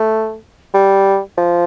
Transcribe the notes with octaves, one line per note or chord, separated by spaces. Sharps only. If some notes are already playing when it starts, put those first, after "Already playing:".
Already playing: A3
G3
F3